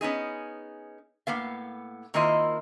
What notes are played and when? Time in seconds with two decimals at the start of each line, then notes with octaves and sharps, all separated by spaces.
0.01 B3 C#4 D#4 G#4
1.27 A2 A#3 B3 F5
2.14 D#3 A#3 C4 E4 F4 D#5